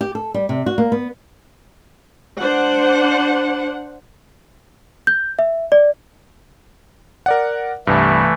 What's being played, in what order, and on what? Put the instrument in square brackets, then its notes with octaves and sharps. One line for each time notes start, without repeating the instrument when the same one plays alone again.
[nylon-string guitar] G4
A4
G3
C3
F#4
A#3
B3
[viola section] D4 C5 F#5
[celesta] G6
E5
D5
[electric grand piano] A#4 D5 F#5
[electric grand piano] C2 G2 [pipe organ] E3 A3